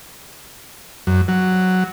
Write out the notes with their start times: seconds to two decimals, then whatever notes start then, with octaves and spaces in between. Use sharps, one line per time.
1.07 F#2
1.28 F#3